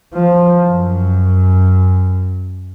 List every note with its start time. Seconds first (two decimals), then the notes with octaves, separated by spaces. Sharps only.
0.14 F3
0.68 F#2